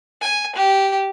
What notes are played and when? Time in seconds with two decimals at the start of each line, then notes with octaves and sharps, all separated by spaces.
0.21 G#5
0.55 G4